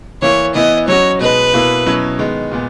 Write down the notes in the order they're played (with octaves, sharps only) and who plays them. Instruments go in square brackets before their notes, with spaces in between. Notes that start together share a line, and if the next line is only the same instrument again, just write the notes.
[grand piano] E3 A#3 E4 [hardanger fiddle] C#5
[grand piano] E3 B3 E4 [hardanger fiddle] D#5
[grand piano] F#3 C#4 F#4 [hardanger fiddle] C#5
[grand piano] B2 G#3 D#4 [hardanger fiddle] B4
[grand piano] B2 A#3 E4
B2 F#3 C#4 E4
D#3 G#3 B3
A#2 G#3 B3